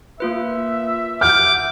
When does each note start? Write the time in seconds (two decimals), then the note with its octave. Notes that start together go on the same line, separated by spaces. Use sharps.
0.20 A#3 F4 B4 E5
1.21 F#5 D6 F6 G6